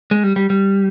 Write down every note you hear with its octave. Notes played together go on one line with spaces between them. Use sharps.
G#3
G3
G3
G3